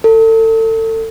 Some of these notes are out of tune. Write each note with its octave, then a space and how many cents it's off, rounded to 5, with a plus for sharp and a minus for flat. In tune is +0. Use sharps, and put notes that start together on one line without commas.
A4 +30